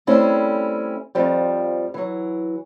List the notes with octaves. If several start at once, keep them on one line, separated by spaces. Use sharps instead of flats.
G3 A3 C4 C#4 E4 G#4
F2 F3 G3
E3 F#3